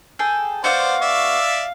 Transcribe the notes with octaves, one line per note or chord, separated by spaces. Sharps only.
G#4 A4 G5
B3 C4 F#4 C5 D5 F5
D5 E5